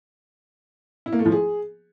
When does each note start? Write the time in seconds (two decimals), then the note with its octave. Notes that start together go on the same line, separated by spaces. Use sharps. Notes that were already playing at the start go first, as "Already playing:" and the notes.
1.06 E4
1.13 A#3
1.19 A3
1.26 F3
1.32 G#4